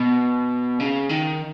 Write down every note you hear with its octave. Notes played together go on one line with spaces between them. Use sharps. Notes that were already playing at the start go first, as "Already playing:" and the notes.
Already playing: B2
C#3
D#3